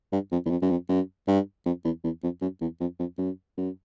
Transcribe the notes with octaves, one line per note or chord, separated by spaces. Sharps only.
G2
F2
E2
F2
F#2
F2
F#2
G2
F2
E2
E2
F2
F#2
E2
F2
F2
F#2
F#2